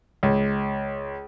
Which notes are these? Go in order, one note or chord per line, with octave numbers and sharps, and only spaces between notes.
C#2